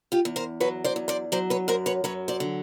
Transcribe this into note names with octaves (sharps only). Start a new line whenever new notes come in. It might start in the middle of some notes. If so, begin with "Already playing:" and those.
F4 G4
E2
A#4 C5
F#3 B4 C#5
C5 D5
E2
C5 D5
F#3 C5 D5
B4 C#5
F#2 A#4 C5
B4 C#5
F#3 B4 C#5
C5 D5
D3